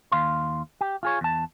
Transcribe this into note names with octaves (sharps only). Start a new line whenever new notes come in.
D#2 F5 C6
G4
F4 G#4 C#5
E2 A5